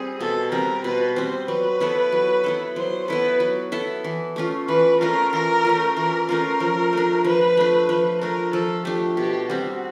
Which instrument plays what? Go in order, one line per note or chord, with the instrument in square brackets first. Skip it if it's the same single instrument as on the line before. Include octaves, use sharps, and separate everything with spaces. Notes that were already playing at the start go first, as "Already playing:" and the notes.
Already playing: [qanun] G3 C4 [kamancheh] G#4
[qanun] B2 [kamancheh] A4
[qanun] G3 C4 [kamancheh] A#4
[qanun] B2 [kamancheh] B4
[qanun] G3 C4 [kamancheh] C5
[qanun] F#3 [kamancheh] B4
[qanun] B3 E4 A4
F#3
B3 E4 A4
[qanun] F#3 [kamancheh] C5
[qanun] B3 E4 A4 [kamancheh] B4
[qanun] F#3
B3 E4 A4
E3
A3 C#4 F4
[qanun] E3 [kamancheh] B4
[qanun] A3 C#4 F4 [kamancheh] A#4
[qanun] E3 [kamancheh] A#4
[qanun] A3 C#4 F4
[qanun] E3 [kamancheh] A#4
[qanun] A3 C#4 F4 [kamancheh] A#4
[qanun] F3
A3 D4
[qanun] F3 [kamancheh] B4
[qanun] A3 D4
[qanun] F3 [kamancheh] B4
[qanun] A3 D4 [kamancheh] A#4
[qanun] F3 [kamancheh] A4
[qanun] A3 D4 [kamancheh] G4
[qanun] B2 [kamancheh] G4
[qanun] G3 C4 [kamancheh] F#4